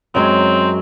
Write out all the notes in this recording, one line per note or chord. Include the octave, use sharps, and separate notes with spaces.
F#2 F#3 G#3 C4